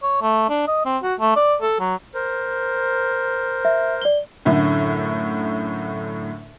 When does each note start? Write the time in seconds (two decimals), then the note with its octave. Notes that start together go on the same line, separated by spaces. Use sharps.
0.03 C#5
0.22 A3
0.50 D4
0.67 D#5
0.86 C4
1.03 F#4
1.20 A3
1.36 D5
1.62 A4
1.80 F#3
2.14 A#4 C5
3.65 E5
4.02 D5 G7
4.45 F#2 A2 D3 A3